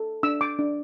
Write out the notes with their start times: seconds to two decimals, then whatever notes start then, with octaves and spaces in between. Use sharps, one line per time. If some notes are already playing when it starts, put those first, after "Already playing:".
Already playing: A4
0.23 D4 E6
0.41 D6
0.59 D4